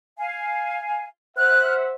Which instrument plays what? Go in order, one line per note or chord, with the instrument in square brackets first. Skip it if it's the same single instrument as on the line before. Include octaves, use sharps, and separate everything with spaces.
[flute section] F5 G#5
[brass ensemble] C5 E5 F#5 [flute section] F6 F#6